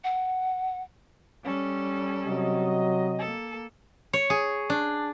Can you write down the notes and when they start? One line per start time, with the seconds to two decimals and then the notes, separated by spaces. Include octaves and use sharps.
0.04 F#5
1.44 G3 C#4 A4
2.27 C3 F#3 D#5
3.19 A#3 A4
4.13 C#5
4.30 G#4
4.70 D4